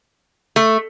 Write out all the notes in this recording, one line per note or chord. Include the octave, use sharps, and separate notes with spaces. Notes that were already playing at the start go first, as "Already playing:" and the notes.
A3